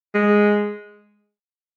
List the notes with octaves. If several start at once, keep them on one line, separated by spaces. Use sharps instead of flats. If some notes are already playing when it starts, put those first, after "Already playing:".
G#3